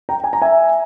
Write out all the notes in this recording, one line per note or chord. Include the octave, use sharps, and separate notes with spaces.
G5 A#5
G#5
A#5
E5 G#5